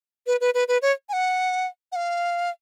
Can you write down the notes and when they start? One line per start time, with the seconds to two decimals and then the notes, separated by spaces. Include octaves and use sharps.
0.27 B4
0.41 B4
0.54 B4
0.68 B4
0.82 C#5
1.09 G#5
1.13 F#5
1.92 F#5
1.96 F5